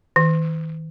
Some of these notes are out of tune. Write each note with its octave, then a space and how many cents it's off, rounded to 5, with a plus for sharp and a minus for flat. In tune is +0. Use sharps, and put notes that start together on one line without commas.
D#3 +45